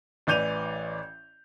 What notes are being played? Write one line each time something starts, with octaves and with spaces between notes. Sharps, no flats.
A1 E3 D5 G6 D#7 F7